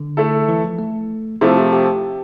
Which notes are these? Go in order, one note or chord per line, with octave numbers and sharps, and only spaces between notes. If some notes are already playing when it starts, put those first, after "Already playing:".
Already playing: D3
A3 E4 A4
E3
F3
A3
C3 F3 A3 E4
G4
G4